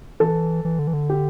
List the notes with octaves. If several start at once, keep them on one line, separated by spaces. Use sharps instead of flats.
E3 A4
E3
D3
E3
D3
G4